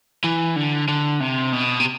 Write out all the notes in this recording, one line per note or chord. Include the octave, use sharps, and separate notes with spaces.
E3
D3
D3
C3
B2
C3